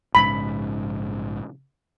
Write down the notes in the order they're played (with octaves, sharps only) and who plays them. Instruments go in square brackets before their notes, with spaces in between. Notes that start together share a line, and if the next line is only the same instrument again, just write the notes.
[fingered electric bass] A#1 G#2 C#3 [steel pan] B5